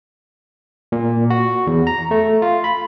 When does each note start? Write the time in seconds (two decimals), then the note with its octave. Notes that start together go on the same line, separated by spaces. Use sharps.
0.92 A#2
1.30 F#4
1.67 E2
1.87 A#5
2.11 A3
2.42 F4
2.64 B5